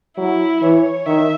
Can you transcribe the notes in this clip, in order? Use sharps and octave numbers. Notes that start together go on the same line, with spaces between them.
F#3 E4
E3 C#5
D#3 E5